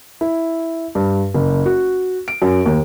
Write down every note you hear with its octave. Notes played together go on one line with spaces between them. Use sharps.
E4
G2
F#1
F#4
D7
F#2
D#2